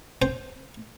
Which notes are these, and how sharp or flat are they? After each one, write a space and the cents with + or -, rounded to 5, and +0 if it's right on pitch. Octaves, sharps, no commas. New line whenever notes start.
C5 +0 G5 +0